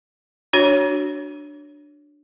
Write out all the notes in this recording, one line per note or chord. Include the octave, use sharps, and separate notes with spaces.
D4 F#4 C#5